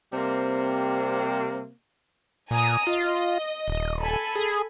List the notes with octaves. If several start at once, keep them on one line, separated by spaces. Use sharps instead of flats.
C3 G3 A#3 C4
A#2 G#5 A#5 D#6
F4 D#5
D#1
A4 G#5 B5
G#4